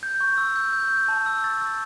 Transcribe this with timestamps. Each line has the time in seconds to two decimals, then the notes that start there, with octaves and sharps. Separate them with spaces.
0.03 G6
0.21 C#6
0.38 E6
0.56 G6
0.73 G6
0.91 G6
1.08 A5
1.26 E6
1.44 C#6 A6
1.61 E6 A6